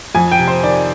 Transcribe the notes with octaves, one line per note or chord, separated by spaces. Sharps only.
F2 G#5
G5
C3
C5
D#3 D5